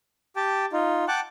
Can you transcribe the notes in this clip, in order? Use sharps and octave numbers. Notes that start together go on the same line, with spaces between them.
G4 G5 A5
D#4 F4
F#5 G5 A5 D6 F#6